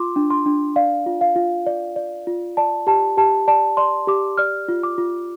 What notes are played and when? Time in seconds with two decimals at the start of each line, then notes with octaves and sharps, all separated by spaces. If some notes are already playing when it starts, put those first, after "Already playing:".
Already playing: F4 C6 D6
0.16 D4
0.30 C6
0.46 D4
0.76 D5 F5
1.06 F4
1.21 F5
1.36 F4
1.66 D5
1.96 D5
2.27 F4
2.57 D5 A5
2.87 G4 A5
3.17 G4 A5
3.48 D5 A5
3.77 D5 C6
4.07 G4 D6
4.38 D5 F6
4.68 F4
4.83 D6
4.98 F4